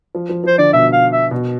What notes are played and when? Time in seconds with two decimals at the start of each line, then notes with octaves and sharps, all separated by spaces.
0.15 F3
0.29 F3
0.44 F3 C5
0.58 D3 D5
0.73 B2 E5
0.93 F5
1.13 E5
1.31 B2